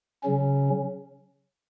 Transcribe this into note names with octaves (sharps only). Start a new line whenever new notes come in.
C#3 F#3 C#4